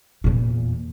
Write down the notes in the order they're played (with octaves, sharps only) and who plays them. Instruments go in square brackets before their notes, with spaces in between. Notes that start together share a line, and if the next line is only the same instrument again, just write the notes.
[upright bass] E2 A#2